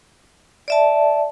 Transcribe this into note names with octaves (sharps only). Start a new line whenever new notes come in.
D5 E5 A5